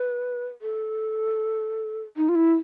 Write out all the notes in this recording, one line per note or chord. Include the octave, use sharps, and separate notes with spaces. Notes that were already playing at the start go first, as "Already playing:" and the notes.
Already playing: B4
A4
D#4
F4
E4